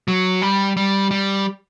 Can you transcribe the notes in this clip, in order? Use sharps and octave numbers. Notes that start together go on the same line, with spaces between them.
F#3
G3
G3
G3